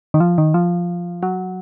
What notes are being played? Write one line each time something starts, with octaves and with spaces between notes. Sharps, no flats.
D#3
F3
D#3
F3
F#3